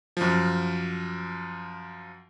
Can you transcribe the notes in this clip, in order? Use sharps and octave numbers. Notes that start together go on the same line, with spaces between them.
F#2 F3